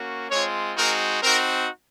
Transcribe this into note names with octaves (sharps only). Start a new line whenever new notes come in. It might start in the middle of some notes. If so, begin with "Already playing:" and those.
Already playing: A#3 C#4 F#4
G#3 C4 F4 C#5
G#3 C4 D#4 F#4 A#4
C4 D#4 F#4 A#4